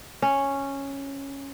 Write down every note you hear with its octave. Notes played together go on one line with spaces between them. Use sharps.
C#4